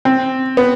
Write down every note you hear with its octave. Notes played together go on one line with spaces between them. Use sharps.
C4
B3